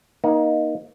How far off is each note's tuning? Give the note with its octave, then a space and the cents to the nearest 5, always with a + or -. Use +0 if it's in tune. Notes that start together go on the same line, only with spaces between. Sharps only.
A#3 +25 D#4 +0